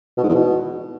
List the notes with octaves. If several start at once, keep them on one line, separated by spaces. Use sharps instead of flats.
B2
G#2
E2
B2